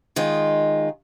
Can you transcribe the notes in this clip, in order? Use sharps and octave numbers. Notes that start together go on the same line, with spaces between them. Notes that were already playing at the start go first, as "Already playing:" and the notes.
D#3 G#3 F4